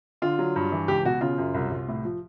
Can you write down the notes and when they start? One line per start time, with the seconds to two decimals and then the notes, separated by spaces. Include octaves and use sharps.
0.22 D3 F4
0.39 F#3
0.56 G2
0.72 E3
0.88 C#2 G4
1.05 B2 F#4
1.21 C#3 F4
1.38 F#2
1.54 C2
1.71 C2
1.88 A2
2.05 F3